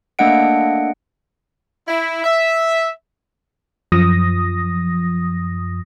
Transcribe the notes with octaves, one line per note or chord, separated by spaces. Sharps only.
A3 A#3 D4 D#5 F#5 D7
E4
E5
F#2 F3 D#6 A#6